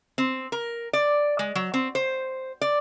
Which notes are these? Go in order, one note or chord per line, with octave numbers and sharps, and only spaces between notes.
C4
A#4
D5
G#3
F#3
C4
C5
D5